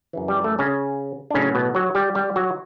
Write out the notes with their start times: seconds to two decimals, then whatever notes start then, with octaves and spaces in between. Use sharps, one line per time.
0.13 F#2 C#3 E3
0.28 G3
0.44 A3
0.59 C#3 C#4
1.31 D4
1.34 A2 C#3 F#3 C#4
1.55 B2 B3
1.75 F#3 F#4
1.95 G3 G4
2.15 G3 G4
2.36 F#3 F#4